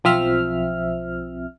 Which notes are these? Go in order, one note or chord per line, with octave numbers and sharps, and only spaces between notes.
B1 F3 C4 E5 F6